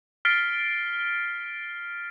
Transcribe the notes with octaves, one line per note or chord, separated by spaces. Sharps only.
F6 A6 B6 C7 D7 G7